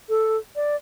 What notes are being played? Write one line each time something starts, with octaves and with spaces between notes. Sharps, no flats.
A4
D5